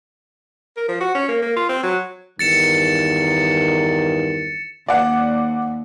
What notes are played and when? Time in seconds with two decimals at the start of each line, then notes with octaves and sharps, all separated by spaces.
0.77 A#4
0.88 F3
1.01 F#4
1.15 C#4
1.29 A#3
1.42 A#3
1.56 F4
1.69 C4
1.83 F#3
2.39 E2 G2 D#3 A6 C#7 E7
4.88 D#2 D5 F#5